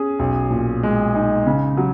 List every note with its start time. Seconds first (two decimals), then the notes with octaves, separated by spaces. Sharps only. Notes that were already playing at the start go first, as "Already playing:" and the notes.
Already playing: C#4 G#4
0.19 B1
0.50 A#2
0.83 G#3
1.15 D#4
1.46 C#3
1.77 F#3